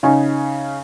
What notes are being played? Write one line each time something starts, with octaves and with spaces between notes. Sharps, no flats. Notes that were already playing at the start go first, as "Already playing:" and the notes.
C#3 C#4 D#4 G#5